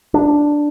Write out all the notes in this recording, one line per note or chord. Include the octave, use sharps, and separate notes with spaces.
D4